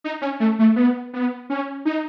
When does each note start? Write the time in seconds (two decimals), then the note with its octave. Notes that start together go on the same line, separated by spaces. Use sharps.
0.04 D#4
0.22 C#4
0.40 A3
0.59 A3
0.76 B3
1.13 B3
1.50 C#4
1.85 D#4